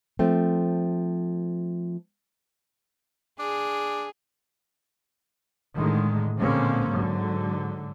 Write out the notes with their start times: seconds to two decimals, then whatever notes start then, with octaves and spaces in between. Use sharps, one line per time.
0.19 F3 A3 C4
3.39 D4 G#4
5.75 A2 D3 D#3 G#3
6.39 A#2 D3 G#3 A#3 C4 C#4
6.90 G#2 D3 F#3